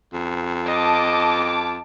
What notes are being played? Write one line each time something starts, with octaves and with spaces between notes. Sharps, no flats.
F2
D#5 A5 D6